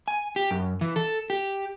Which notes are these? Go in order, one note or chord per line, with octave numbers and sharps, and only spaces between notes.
G#5
G4
F#2
E3
A4
G4